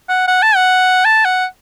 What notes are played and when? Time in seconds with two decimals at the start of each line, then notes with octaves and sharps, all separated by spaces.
0.09 F#5
0.28 F#5
0.42 A5
0.56 F#5
1.05 A5
1.25 F#5